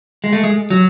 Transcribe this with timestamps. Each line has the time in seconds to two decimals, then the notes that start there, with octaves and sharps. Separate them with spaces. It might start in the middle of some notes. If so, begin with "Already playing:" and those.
0.24 G#3
0.33 A3
0.44 G#3
0.70 F#3